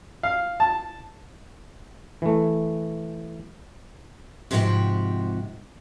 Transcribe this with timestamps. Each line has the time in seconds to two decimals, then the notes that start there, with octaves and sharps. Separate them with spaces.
0.23 F5
0.60 A5
2.22 E3 A3
4.51 G#2 C3 F3 D#4 F#4 G4